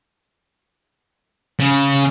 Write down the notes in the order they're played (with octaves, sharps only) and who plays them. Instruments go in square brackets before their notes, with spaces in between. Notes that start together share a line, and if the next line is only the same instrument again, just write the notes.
[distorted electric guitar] C#3